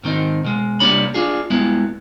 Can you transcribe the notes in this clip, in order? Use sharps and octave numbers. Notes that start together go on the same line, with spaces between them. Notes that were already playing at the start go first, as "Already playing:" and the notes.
G#2 D#3 C4 D#4
B2 G#3
C2 G3 A#3 D4 C#5 B5
D4 F4 G#4
G2 G#3 B3 E4